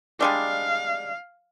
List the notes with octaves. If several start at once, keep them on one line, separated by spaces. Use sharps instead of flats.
G3 G#3 D4 F5